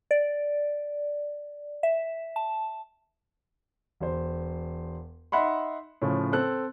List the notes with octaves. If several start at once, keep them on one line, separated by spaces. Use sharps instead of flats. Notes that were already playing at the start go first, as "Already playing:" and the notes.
D5
E5
A5
E1 C5
D#4 E5 F#5 B5 C6
A2 C#3 F3
C4 A4 F#6